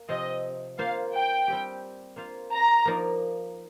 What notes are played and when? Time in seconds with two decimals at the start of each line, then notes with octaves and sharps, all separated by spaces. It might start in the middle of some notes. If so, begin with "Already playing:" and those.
Already playing: A#3
0.09 C3 F3 C4 D#5
0.78 A#3 F4 C5 F5
1.13 G5
1.48 G3 C4 G4
2.16 A#3 F4 C5 F5
2.52 A#5
2.85 F3 A#3 D#4 A#4 D5